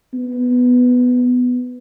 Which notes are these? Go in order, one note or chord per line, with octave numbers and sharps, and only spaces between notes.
B3